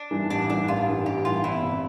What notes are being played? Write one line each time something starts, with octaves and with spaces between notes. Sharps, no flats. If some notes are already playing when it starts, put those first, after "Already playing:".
Already playing: D4
G2 E3 G3
A1 D4
G2 E3 G3 D4
A1 F4
G2 E3 G3
A1 G4
G2 E3 G3 F4
G1 E4
C3